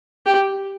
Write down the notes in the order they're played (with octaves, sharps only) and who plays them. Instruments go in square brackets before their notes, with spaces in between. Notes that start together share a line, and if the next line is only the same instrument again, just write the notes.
[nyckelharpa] G4